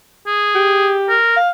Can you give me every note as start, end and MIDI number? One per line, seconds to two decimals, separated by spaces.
0.27 0.95 68
0.55 1.17 67
1.09 1.36 70
1.37 1.51 77